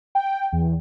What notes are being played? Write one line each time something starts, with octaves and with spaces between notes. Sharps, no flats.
G5
E2